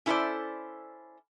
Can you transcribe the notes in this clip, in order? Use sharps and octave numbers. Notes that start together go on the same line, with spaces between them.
C#4 E4 A4 B4 C5 D5